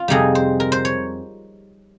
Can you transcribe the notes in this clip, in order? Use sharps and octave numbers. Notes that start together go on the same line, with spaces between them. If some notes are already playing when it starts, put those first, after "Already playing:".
Already playing: F4
F2 C3 G3 C4 D#4 G#4
C5
A#4
C5
C#5